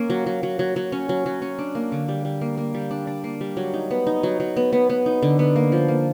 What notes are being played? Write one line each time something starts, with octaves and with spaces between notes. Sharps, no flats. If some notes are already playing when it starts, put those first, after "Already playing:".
Already playing: A#3 C#4
F#3
F#3
F#3
F#3
F#3
C#4
F#3
F#3
C#4
D4
A#3
D3
G3
G3
A#3
A#3
G3
D4
D4
A#3
G3
F#3
D#4
B3
D#4
F#3
F#3
B3
B3
B3
D#4
D3
B3
A#3
F3
A#3